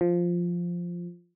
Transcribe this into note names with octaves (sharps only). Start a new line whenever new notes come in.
F3